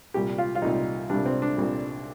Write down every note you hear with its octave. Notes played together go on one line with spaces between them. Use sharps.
C2 A#2 G3 G4
F4
F4
C2 A#2 G3 D#4
C2 A#2 G3 D4
C4
D4
C2 A#2 G3